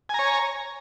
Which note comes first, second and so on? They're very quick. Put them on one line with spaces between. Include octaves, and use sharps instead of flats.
G#5 A#5 C#5